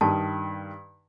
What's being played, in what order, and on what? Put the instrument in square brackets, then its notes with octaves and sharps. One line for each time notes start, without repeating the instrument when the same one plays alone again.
[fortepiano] G2 D#3 [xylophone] A5